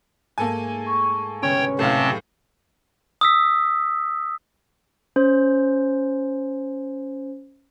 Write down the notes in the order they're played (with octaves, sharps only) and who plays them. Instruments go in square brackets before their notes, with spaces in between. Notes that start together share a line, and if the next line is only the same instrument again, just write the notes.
[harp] G#2 A3 [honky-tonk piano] A#3 A4 G#5
[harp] C#6
[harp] C2 D3 B3 [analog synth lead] C#4 [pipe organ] C#5 G5
[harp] F#1 [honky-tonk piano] A2 F5 [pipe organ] C3 C4 A5
[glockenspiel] D#6 E6 B6
[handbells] C#4 C5